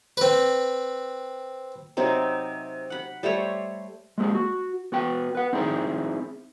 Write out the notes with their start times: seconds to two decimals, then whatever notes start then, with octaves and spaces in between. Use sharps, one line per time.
0.17 C4 B4
1.97 C3 F#3 C4 D#4
2.90 F#5 B5
3.23 G3 A3 C5 C#5
4.18 G#3 A#3 C4 G#4
4.35 F#4
4.92 B3 F#4 G5
5.35 B4 F#5
5.53 C4 D#4 E4 G#4 C5